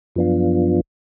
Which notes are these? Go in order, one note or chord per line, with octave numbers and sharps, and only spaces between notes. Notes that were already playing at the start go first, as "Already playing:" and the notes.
F#2 F3 B3 D4 F4